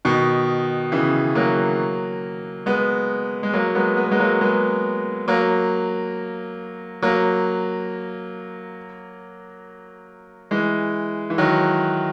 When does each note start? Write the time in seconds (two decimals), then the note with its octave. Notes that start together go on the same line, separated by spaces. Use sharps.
0.05 B2 D#3
0.92 C#3 E3
1.35 F#3 A#3
2.66 G#3 B3
3.43 G#3
3.53 F#3 A#3
3.75 G#3 B3
3.97 B3
4.05 A#3
4.11 G#3 B3
4.19 F#3 A#3
4.41 G#3 B3
5.28 F#3 A#3
7.02 F#3 A#3
10.51 E3 G#3
11.30 E3
11.38 D#3 F#3